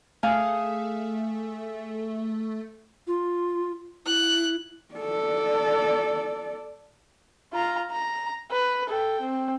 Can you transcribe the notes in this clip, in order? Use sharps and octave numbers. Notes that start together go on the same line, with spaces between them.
A3 G#4 F5
F4
E4 F#6
A4 D5
F4 A#5
A#5
B4
A4 G5
C4